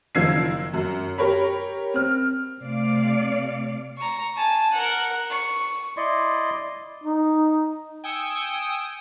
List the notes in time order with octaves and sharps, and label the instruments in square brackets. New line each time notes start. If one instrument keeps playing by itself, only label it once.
[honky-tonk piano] F#1 D#3 F3 E6 G#6 C7
F#2
G4 A#4 C#5 B5
C4 F6
[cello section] C3 A3 D5 F5
[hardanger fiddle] A#5 C#6
G#5 A5
A#4 F#5
C#6
[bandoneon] E4 D5 D#5 C6
[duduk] D#4
[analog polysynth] G5 G#5 D#6 E6 C#7